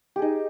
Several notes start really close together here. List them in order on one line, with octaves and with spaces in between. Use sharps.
G4 G#4 D#4